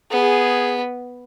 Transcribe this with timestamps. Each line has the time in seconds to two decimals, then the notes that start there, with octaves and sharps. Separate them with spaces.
0.11 B3 G#4